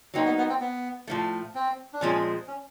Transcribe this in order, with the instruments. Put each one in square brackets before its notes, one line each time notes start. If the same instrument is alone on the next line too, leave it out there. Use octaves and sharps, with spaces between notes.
[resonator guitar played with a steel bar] F#3 A#3 D#4 [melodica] C4
[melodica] B3
B3
C4
B3
[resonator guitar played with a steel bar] A2 F3 A3
[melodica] C4
D4
[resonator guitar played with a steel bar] A#2 F3 G#3 C4 [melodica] C#4
[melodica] C#4